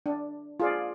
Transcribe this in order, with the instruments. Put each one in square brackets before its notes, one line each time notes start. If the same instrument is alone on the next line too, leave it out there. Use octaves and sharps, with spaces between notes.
[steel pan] D4
F4 G#4 D5